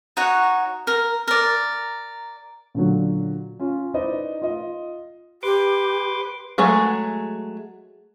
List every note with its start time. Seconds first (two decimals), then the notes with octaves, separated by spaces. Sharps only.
0.17 D#4 F#4 C#5 F#5
0.87 A#4
1.28 A#4 D5
2.75 A#2 D3 F#3
3.60 C#4 F4
3.94 D#4 E4 B4 C5 D5 D#5
4.42 F4 D#5
5.43 G4 B4 C6 D6
6.58 F#3 G#3 A3 G#4